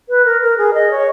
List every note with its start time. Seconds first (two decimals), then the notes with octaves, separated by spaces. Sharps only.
0.09 B4
0.25 A#4
0.41 A#4
0.57 G#4
0.73 D#5
0.90 C#5